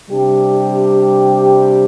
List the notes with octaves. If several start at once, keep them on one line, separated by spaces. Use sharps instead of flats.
C3 G3 D4 G4